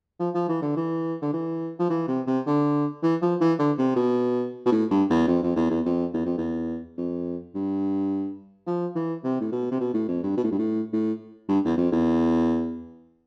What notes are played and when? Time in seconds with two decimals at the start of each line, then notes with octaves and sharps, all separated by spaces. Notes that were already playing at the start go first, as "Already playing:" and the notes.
0.20 F3
0.35 F3
0.48 E3
0.62 D3
0.76 E3
1.22 D3
1.33 E3
1.79 F3
1.90 E3
2.08 C3
2.27 C3
2.46 D3
3.03 E3
3.22 F3
3.41 E3
3.59 D3
3.78 C3
3.96 B2
4.66 B2
4.72 A2
4.91 G2
5.10 E2
5.28 F2
5.43 F2
5.56 E2
5.71 E2
5.85 F2
6.14 E2
6.26 F2
6.38 E2
6.98 F2
7.55 G2
8.67 F3
8.95 E3
9.24 C3
9.41 A2
9.52 B2
9.71 C3
9.80 B2
9.94 A2
10.08 F2
10.23 G2
10.37 B2
10.44 A2
10.52 G2
10.59 A2
10.93 A2
11.49 G2
11.65 E2
11.78 F2
11.92 E2